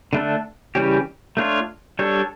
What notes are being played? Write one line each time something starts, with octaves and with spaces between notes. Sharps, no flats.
D3 A3 D4 A4
C#3 E3 G3 C#4 G4
A3 D4 F4 C#5
G3 D4 A4 C#5